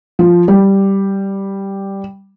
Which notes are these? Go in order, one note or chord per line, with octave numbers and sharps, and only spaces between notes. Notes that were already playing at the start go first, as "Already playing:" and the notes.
F3
G3